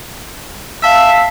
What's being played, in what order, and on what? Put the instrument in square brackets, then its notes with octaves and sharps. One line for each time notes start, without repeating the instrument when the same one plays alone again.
[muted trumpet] E5 [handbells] F5 A5 E6